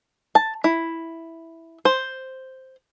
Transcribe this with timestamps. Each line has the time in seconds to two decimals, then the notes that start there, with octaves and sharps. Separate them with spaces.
0.35 A5
0.64 E4
1.85 C5